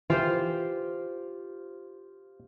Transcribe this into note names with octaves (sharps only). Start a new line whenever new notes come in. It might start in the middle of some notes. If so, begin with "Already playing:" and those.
E3 F4 G4 C5